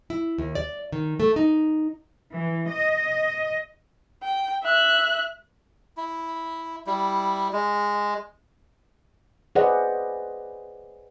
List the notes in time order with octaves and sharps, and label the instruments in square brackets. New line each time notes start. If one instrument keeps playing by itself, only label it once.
[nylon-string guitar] E4
D#2
D5
D#3
A3
D#4
[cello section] E3
D#5
[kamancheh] G5
E5 F#6
[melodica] E4
G3 E4
G#3
[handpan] G#4 B4 C5 D5 D#5 F#5